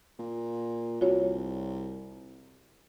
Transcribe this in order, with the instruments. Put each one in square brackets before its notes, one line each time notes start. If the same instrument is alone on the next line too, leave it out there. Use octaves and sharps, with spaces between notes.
[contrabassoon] A#2
[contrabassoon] C2 [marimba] F4 F#4 C#5